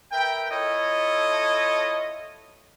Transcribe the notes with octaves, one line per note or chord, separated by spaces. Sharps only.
A#4 B4 E5 G5
E4 F4 A4 C#5 D#5